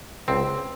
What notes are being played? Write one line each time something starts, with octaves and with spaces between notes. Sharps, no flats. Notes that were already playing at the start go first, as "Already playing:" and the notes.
C#2 C4